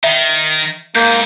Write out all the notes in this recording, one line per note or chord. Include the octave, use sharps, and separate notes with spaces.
D#3 E5
G#2 A#3 G6